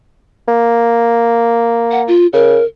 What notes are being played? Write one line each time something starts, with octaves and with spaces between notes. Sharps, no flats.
A#3
F#5
F4
C#3 A#4